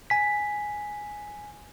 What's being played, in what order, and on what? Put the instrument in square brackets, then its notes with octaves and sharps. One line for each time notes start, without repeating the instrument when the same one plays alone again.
[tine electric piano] G#5 B6